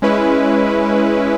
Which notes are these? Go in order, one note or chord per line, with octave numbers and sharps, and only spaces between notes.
G#3 C#4 E4 B4